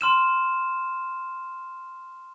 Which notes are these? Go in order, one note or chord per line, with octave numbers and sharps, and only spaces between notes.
C6 F6 E7